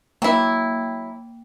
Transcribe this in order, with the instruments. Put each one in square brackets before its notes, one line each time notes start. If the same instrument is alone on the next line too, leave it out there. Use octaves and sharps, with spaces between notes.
[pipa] F#3 E4 [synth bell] A#3 G5